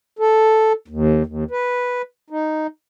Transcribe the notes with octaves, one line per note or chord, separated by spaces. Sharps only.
A4
D#2
D#2
B4
D#4